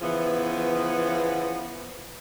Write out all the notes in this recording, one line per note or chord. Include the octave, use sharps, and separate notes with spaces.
C#3 E3 F3 B3